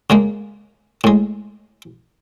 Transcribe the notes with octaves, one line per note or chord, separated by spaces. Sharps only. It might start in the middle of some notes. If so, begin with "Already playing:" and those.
C#3 G#3 A#3
A2 G#3